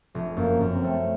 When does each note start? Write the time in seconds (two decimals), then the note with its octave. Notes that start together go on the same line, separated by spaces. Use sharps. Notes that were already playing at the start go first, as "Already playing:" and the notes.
0.15 F1
0.37 F#2 A#3
0.61 F#2
0.72 C4
0.84 A3